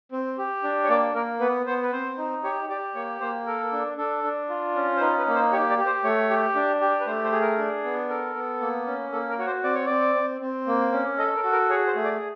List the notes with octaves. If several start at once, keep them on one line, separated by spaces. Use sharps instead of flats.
C4
G4
D4
C#5
A#3 D5
A#3 A#4
B3 B4
B3 C5
B4
C4 C5
D#4
G4 C#5
G4 D5
A#3 C#5
A#3 C5
A4 A#4
D4
D4 A4
D4
F4
C#4
C5
D#4 B4
B4
A#3
C5
G4 C#5
D5
G4
C5
A3 C#5
G4
D4
G4
B4
A3 C5
C5
G#4
A#4
D4
B3
A4 A#4
B3
A#3
C#4
A#3 A4
A#4
F#4 C#5
C5
C4 D5
C#5
C4 D5
C4
C4
A#3
C#4
A4 D#5
A#4
F#4
A#4
G#4 C#5
C5
A3
D5